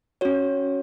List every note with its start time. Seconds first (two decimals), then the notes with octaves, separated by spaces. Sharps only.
0.21 C#4 F#4 C#5